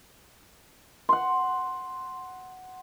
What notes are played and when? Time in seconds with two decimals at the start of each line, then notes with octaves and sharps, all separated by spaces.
1.09 F#5 C6